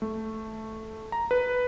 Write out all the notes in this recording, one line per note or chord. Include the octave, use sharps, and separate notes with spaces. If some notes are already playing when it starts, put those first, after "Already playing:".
A3
A#5
B4